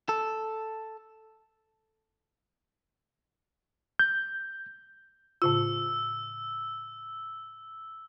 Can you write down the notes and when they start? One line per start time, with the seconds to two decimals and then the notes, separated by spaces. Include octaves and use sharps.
0.09 A4
3.99 G6
5.42 A2 C#3 F4 E6